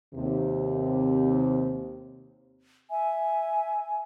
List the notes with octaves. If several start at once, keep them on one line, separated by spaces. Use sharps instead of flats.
D#2 C3
E5 G#5